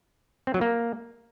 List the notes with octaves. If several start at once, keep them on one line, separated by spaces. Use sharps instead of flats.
C4
F#3
A#3